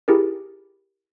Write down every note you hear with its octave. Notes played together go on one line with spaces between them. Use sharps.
E4 G4 G#4 A#4